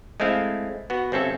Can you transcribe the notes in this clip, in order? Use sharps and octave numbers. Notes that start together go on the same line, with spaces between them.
G#3 A3 C4 E4 F5
B3 F#4
G1 C4 C#4 A4 E5